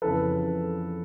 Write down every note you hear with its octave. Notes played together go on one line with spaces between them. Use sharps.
F2 C#3 E3 A4 B4